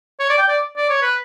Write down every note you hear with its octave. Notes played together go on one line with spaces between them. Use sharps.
C#5
D5
G5
D5
D5
C#5
B4